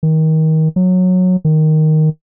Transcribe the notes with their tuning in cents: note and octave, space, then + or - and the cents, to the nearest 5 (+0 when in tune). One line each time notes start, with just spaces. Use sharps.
D#3 +25
F#3 -15
D#3 +0